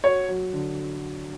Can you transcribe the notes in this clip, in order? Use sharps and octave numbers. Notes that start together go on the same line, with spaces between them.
F#4 C#5
F#3
D3